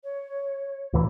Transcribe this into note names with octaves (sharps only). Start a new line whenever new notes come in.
C#5
D2 A#2 E3